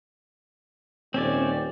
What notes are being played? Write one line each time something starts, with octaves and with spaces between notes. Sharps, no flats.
D#1 C4 C#4 D5